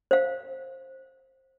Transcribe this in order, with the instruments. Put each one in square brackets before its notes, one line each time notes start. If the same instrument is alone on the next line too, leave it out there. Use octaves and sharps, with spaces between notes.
[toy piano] C5 F5